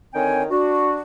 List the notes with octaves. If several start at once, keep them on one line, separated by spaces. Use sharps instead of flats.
D3 D#3 C4 C#5 G5 G#5
D4 F#4